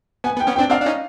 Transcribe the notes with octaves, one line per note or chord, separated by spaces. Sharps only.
B3 G#5
B3
G5
B3 C#4
C4 D4 G5
C4 D4 F5
D4
C#4 D#4